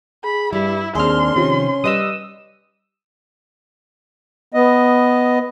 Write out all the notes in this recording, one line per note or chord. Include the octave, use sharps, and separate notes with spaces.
G#4 B5
G2 G3 E4
D#2 C4 D4 G#4 C6 F6
C3 D#3 F3 C#4
G3 B4 D#5 D#6 E6
B3 D#5